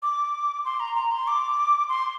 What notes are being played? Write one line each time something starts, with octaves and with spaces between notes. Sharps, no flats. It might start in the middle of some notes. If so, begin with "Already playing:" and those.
D6
C6
A#5
A#5
C6
D6
C6